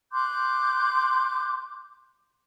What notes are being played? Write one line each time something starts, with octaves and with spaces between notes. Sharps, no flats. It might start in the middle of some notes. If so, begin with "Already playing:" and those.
C6 D6 F#6 G6